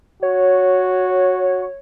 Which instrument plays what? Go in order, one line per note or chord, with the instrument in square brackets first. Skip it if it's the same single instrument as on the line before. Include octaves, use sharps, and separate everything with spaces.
[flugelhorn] F#4 [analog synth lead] C#5